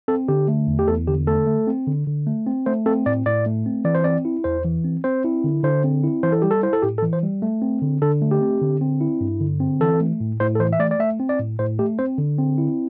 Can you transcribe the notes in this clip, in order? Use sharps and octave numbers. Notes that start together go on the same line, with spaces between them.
C4 A4
D3 G4
A3
E2
G4
E2 A4
D3 G4
A3 A4
A3
C4
D3
D3
A3
C4
A3 C5
C4 A4
A2 D5
A2 D5
A3
C4
E3 D5
C5
C4 D5
E4
E2 C5
E3
C4
C4 C5
E4
D3
D3 C5
C4
E4
E3 C5
A4
G3 G4
A4
E4 C5
A4
A2 G4
A4
E3
C5
G3
A3
C4
D3
D3 A4
A3
G4
C4
D3
C4
E4
G2
D3
C4
E3 A4
A3
A2
A2 C5
A4
E3 C5
E5
A3 D5
D5
A3 E5
C4
D5
A2
A2 C5
A3 G4
C4 C5
D3
C4
E4